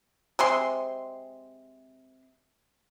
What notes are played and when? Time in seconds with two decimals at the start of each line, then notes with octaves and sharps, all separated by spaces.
0.39 C3 G#3 C4 C6